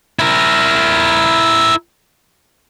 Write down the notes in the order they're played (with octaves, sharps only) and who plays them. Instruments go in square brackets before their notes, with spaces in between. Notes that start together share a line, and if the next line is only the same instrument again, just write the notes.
[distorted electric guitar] E4 A#4